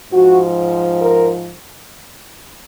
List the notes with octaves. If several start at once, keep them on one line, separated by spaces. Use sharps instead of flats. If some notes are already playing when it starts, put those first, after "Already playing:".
G#2 F3 F#4
A#4